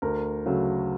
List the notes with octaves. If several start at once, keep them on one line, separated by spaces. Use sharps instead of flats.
D2 A#4
C#3 F#3 A3